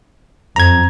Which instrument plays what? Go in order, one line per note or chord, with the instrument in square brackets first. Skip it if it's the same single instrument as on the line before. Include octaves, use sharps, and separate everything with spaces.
[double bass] F2 [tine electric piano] A#5 G#6